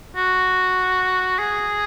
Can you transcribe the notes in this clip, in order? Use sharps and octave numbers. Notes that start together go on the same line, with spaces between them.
F#4
G#4